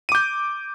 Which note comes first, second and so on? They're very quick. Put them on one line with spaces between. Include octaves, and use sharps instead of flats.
D#7 D6 G6